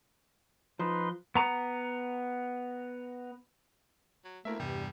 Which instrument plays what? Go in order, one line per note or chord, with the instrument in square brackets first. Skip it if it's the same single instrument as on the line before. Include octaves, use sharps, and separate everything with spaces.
[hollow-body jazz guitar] F3 [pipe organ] D#4 B4 C6
[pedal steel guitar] B3 A#5
[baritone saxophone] F#3
[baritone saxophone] D2 [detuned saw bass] A3 [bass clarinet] A#3 [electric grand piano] E4 A#4 E5
[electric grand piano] E2 [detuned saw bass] G2 [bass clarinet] C3 [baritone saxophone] G3